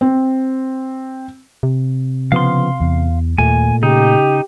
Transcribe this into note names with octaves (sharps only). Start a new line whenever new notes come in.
C4
C3
C#3 F3 B3 F5 C6
E2
D#2 A#2 A3 G#5
C#3 D#4 G4